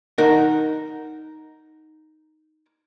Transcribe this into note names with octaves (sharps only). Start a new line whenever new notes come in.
D#4 A#4 F#5